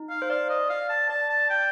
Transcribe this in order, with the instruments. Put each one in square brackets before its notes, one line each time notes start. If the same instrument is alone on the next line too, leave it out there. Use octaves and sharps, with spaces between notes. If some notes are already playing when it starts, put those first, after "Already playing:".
Already playing: [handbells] D#4
[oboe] F5
[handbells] C5
[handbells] D5 [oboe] F5
[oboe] D#5
F5
A5
[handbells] D5 [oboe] A5
[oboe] A5
G5